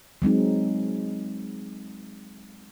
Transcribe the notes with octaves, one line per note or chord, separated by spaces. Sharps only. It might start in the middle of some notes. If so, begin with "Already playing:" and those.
F#3 G#3 C4 D#4